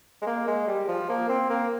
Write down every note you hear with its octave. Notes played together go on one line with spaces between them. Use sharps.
G#3
A#3
G#3
G3
F3
A#3
C4
A#3